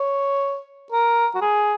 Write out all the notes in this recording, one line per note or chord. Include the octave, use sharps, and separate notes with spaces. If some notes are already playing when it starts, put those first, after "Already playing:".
Already playing: C#5
A#4
F#4
G#4